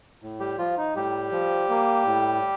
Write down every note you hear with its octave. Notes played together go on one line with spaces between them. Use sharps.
A2
G3 G4
F3 F4
D#4
A2 G3 G4
F3
A#3
A2